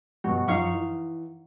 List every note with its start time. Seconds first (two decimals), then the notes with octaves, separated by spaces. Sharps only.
0.24 G2 B2 F#4
0.48 F#2 F3 D#4 F5 C#6
0.73 E3